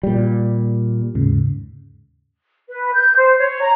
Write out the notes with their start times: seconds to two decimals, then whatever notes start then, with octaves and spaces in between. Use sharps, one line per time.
0.03 A#2 G3
1.15 D#2 G#2 C#3
2.69 B4
2.93 G6
3.16 C5
3.39 C#5
3.60 A#5